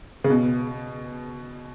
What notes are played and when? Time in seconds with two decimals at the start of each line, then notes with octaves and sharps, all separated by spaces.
0.24 C#3
0.30 B2